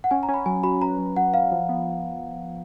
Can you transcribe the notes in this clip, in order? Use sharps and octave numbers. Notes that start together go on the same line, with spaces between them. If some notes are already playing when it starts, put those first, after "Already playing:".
F#5
C#4 G#5
A#5
C#4
B5
F#3 G#5
F#4 B5
B4 A#5
F#3
F#3 F#5
F#4 F5
F3
B3